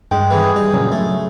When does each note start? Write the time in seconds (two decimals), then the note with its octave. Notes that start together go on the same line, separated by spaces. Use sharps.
0.11 G2 G#3 G5
0.30 E2 D3 E3 G#4
0.56 G3 D#4
0.74 A#1 C#3 F#3
0.92 A3